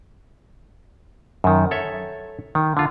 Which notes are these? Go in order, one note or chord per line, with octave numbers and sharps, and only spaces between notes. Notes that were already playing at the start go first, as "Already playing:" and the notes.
F#2 D#3
A4 C#5 E5
D#3
D3 F4